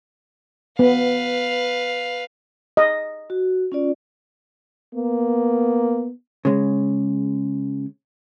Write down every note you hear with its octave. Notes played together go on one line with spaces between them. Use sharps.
B3 B4 F5
D#5
F#4
C#4 F4 D5
A#3 B3
C#3 G#3